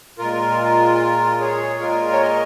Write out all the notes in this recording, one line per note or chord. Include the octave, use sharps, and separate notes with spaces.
A#2 G#3 F4 A#4
G#4 C#5
A#2 G#3 F4 A#4
C#5
A#4 D#5